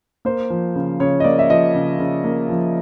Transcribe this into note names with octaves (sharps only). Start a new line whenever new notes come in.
A#3 C5
F3
C#3
C#3 C#5
D#5
A#3 D5
E5
F3 D#5
C#3
C#3
A#3
F3